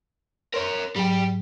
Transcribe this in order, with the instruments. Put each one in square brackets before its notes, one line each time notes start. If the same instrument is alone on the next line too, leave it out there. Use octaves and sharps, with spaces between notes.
[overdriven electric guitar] A#4 C#5 [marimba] C6
[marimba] G#2 F#3 [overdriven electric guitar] G3 G5